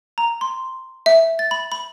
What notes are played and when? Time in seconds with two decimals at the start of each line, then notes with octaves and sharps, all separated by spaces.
0.18 A#5
0.41 C6
1.06 E5
1.39 A6
1.51 B5
1.72 B5